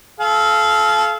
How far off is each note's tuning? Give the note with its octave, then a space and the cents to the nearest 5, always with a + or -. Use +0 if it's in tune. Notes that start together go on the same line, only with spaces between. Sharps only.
A4 -35 F5 -20